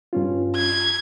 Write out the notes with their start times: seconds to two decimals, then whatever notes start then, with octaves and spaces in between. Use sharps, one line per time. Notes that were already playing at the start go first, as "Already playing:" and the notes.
0.13 G2 C#4 F4
0.56 G#6